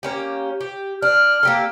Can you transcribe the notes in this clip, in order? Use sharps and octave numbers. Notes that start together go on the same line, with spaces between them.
A#3 C#4 G4
G4
D4 F6
A#3 G4 A4